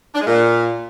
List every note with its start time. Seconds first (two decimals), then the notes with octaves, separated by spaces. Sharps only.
0.15 D4
0.21 G#3
0.27 A#2